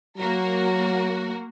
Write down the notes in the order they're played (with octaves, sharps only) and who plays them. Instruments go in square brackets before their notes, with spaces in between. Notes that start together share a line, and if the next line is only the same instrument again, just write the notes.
[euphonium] F#3 [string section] A#3 F#4 A#4